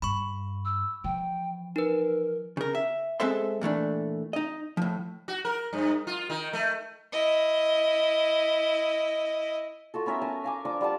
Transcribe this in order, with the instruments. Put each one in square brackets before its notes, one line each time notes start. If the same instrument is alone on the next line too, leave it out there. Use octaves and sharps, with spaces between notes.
[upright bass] G2 [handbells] B5 C#6
[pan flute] E6
[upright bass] E3 F3 [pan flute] G5
[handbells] D#4 B4 [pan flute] A#4
[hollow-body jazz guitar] C#3 A#4
E5
G#3 C4 A4 C5 E5 C6
A#2 E3 A3 D4
D#4 D#5
A2 F3
[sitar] F#4
A#4
G2
F4
D#3
A3
[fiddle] E4 D#5
[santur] F4 F#4 A4
B3 C#4 A#4 E5
A#4 G#5 A5
F5 G#5 D6
F3 D4 D6
G3 F4 F#5 A5